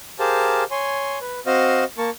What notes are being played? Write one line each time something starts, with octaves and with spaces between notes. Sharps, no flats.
G4 G#4 A#4 C5 F5 A5
C#5 G#5 C6
B4
C4 F#4 C5 D#5 F5
A#3 A#4 A5 C#6